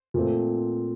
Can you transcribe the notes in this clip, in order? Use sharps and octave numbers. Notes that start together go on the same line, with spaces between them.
A#2 A3 C4